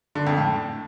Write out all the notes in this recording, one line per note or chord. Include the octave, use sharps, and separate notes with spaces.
D3
F2
A2